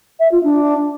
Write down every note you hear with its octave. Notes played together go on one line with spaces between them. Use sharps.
E5
F4
D4